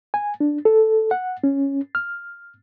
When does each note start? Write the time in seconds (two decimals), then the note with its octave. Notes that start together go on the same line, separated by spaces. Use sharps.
0.14 G#5
0.40 D4
0.65 A4
1.11 F#5
1.44 C#4
1.95 F6